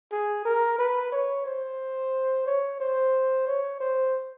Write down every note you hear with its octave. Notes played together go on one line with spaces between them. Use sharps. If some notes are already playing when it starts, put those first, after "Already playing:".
G#4
A#4
B4
C#5
C5
C#5
C5
C#5
C5